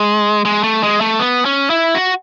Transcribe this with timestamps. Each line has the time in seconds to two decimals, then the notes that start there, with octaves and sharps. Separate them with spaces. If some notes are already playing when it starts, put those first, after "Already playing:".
Already playing: G#3
0.45 G#3
0.63 A3
0.83 G#3
1.01 A3
1.19 B3
1.45 C#4
1.70 E4
1.94 F#4